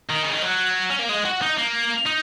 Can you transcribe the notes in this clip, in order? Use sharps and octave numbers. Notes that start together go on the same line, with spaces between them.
D#3
C#3
D#3
F#3
C#4
A#3
G#3
F#4
D#4
A#3
D#4